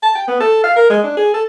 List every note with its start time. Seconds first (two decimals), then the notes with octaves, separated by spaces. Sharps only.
0.03 A5
0.15 G5
0.28 B3
0.40 A4
0.64 F5
0.76 A#4
0.90 G#3
1.04 D4
1.17 G#4
1.34 A4